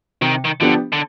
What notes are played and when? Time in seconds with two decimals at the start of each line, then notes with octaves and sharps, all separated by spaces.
0.21 C3 D#3
0.45 D#3
0.61 D3 F3 B3 D4 G4
0.93 D3